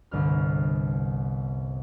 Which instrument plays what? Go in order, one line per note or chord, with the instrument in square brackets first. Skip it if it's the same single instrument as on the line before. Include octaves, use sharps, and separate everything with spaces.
[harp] G1 C2 F6